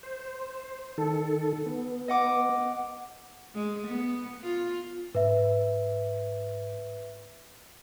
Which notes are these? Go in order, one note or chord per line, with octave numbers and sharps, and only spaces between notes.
C5
D#3 A4
B3
D#5 F#5 D6
G#3
B3
F4
G#2 B4 E5